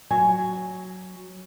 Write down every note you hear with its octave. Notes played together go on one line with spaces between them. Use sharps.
F#3 G#5